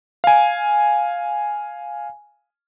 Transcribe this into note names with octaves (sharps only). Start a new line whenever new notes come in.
F5 G#5